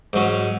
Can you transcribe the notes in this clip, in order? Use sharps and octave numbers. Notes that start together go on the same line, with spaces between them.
G#2 F#3 C#4